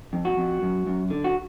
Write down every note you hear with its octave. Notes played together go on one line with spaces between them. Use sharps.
F2
F#4
F2
F#2
F#2
D3
F#4